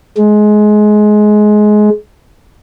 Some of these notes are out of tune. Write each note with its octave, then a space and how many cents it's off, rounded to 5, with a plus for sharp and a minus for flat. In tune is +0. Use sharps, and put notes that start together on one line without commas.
G#3 +20